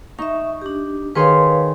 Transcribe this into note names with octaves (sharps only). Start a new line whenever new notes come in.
D#4 E5 C#6
D4 G4
D#3 G#4 B4 C#5 F5 C6